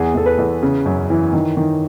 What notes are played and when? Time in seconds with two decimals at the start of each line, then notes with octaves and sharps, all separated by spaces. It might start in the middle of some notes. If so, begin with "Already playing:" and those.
Already playing: E2 E3 G#4
0.15 E2 A4
0.26 B4
0.38 E2
0.63 C#3
0.86 F#2
1.10 E3
1.33 D#3
1.57 D#3